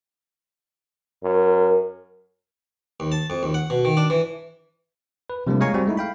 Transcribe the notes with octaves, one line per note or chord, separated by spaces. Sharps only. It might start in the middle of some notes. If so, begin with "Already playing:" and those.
F#2 A#4
D#2
A5
F2
D#2
F#5
B2
D#3
D4
E3
B4
C3 F3 G3 A3 A#3 D4
G#3 C#5 F5 G#5 A#5 C#6
G3 C4 F#4
G#3 A3 D#4 E4
F5 G5 B5